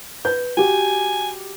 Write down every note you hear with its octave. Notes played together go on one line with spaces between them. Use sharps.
B4 G6
F#4 G4 G#5